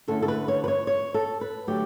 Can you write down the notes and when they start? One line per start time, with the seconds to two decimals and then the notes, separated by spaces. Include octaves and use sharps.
0.08 D3 A3 C#4 E4 A4
0.22 A4
0.28 B4
0.48 C#5
0.64 B4
0.68 C#5
0.87 C#5
1.14 A4
1.41 B4
1.67 D3 F#3 A3 G4